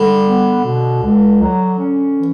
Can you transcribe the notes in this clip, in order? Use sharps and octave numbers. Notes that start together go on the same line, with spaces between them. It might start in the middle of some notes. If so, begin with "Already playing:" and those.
Already playing: D3 G3
B3
B2
C#2
F#3
C#4
E3